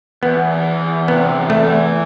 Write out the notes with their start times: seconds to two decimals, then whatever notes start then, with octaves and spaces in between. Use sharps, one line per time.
0.23 E2 B3
0.52 E3
0.80 E2
1.08 C3 B3
1.36 E2
1.50 A3
1.63 E3